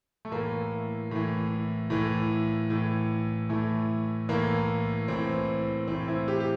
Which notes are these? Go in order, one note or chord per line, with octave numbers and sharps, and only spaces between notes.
A3
A2 E3 A#3
A2 E3
A2 E3
A2 E3
A2 E3 A3
A2 E3 A#3
A2 E3 C4
A2 E3 C4
E4
G4
G4